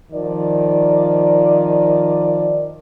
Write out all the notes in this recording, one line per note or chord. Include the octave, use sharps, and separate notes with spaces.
D#3 F3 D5